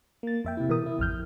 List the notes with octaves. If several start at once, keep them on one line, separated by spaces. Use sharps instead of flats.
A#3 A6
F2 E5 G5
C3 E4
B2 E3 A#4 D#6
E4
A1 F2 F6 G6